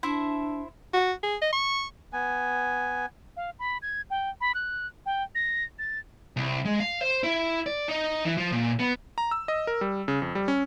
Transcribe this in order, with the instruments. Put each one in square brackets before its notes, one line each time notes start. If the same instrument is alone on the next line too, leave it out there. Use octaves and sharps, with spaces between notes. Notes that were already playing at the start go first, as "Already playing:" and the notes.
[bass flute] D4 [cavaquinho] E4 C5 E5
[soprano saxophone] F#4
G#4
D#5
C#6
[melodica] B3 G#5
[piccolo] F5
B5
G#6
G5
B5
F#6
G5
A#6
A6
[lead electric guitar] C2
G#3
F5
C5
E4
D5
D#4
E3
F3
A#2
B3
[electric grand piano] A#5
E6
D#5
A#4
G3
C#3
F2
G3
C#4